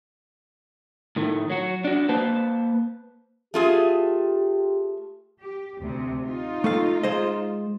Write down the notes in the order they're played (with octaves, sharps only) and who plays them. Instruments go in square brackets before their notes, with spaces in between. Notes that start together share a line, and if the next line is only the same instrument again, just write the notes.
[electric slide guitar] A2 D#3 A3
F#3 F#4
D4 F#4
A#3 B4 C5 A5
[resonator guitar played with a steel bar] A3 F4 G#4 [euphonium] G4
[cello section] G4
D2 C3
D#4 F4
[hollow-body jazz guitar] A3 A4 F5
G#3 C5 D#5